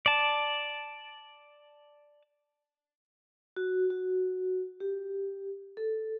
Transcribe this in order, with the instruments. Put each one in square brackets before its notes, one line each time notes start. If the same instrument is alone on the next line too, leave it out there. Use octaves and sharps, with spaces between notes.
[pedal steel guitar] D5 A5
[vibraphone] F#4
F#4
G4
A4